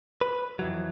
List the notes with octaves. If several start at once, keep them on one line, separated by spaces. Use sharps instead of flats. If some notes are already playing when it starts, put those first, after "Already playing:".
B4
F2 E3 F#3